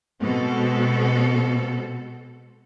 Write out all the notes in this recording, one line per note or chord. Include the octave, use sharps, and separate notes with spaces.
B2 G#3 C4 A4